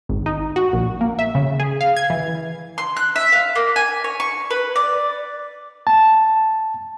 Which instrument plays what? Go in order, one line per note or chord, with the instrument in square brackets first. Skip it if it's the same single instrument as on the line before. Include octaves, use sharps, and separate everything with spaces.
[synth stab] G#1
D#4
F#4
A#1
A#3
E5
C#3
G#4
F5
G#6
E3
[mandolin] C6
F#6
E5
F5
A#3
G#5
C#5
C#6
B4
D5
[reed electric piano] A5